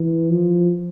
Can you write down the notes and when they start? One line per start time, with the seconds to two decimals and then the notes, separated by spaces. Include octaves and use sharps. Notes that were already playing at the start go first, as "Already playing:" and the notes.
Already playing: E3
0.30 F3